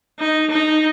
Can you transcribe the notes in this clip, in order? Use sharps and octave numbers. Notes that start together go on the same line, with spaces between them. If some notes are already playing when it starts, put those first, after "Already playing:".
D#4
D#4